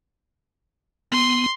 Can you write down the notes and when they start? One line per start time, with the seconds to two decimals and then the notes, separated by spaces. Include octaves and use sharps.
1.12 B3 C6